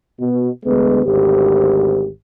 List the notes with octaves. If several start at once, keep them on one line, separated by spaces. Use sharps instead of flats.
B2
D2 G#3 B3
G#1 D2 G4